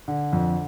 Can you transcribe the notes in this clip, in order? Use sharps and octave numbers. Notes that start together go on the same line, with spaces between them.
D3
F2